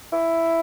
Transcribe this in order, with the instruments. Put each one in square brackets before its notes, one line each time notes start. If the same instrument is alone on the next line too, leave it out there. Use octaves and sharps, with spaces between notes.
[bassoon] E4